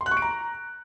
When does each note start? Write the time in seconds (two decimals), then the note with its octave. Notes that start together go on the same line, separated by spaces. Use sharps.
0.01 C6
0.06 F#6
0.11 C#6
0.17 D7
0.22 A#5